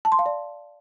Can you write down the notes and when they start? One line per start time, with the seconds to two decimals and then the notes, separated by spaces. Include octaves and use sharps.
0.05 A5
0.12 C6
0.19 F5
0.26 D5